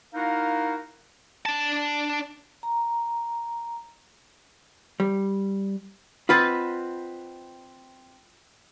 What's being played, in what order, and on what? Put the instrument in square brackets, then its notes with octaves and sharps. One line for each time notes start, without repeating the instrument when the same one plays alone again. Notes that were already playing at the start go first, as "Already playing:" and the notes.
[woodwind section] A#3 D#4 E4 F#4 A#4 F5
[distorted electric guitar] D4 A5
[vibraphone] A#5
[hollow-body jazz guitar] G3
[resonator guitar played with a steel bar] C4 B4 D#5 [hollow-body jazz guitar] F4 F#5 B5 [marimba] F6 A6